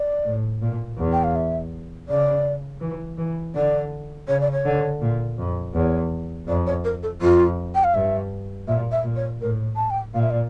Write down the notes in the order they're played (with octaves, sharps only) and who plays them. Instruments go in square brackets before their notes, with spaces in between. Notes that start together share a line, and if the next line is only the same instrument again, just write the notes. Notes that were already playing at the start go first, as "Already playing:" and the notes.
Already playing: [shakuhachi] D5
[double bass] A2
A#2
E2
[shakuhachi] G5
F5
E5
[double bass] C#3 [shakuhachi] D5
[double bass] E3
E3
[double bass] D3 [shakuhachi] D5
[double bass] C#3 [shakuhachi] C#5
[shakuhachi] D5
C#5
[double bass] D3
A#2
F2
[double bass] E2 [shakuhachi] C#5
[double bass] F2 [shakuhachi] D5
[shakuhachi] C#5
A#4
A4
[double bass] F2 [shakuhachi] F4
[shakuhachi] G5
F5
[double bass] G2 [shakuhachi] E5
[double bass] A#2 [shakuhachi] E5
[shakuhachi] E5
[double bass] A#2
[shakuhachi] C#5
[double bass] A2 [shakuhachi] A#4
[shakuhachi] A5
G5
[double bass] A#2 [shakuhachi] F5
[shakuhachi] E5
D5